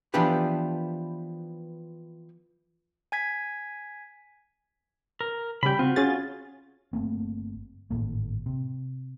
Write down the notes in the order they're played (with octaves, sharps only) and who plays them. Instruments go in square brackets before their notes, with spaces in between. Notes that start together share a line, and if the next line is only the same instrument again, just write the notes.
[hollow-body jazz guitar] E3 F3 B3 D4 G4 B4
[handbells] G#5 G#6 B6
[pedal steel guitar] A#4
[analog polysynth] C#3 G3 [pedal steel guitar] G5 B5
[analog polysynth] C4 [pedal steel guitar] F4 F#4
[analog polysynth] C#4 G#4 A6
[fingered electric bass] G1 A3 A#3 C4
G#1 A2 A#3
C3